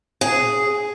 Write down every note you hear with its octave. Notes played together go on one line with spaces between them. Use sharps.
G#4